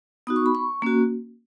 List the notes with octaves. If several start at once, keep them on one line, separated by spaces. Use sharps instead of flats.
B3 D#4 F#4 D#6
C#6
B5
C#6
A#3 C#4 F#4